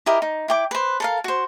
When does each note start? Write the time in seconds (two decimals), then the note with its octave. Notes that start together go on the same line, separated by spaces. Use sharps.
0.06 E4 G4 A#4 D#5
0.22 D#4
0.48 E4 G5 D6
0.71 B4 C5
1.00 A4 A#4 F5
1.24 F#4 C5